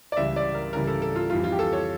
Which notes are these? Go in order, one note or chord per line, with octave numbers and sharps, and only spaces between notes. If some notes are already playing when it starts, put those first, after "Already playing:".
D5
C#2 C#3 E3 G3 E5
D5
A#4
C#2 C#3 E3 G3 A#4
A4
A4
F4
F2 E3 G3 F4
F4
G4
A4
C#5